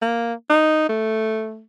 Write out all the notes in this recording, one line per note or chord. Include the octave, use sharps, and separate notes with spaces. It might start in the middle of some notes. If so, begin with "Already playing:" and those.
A#3
D#4
A3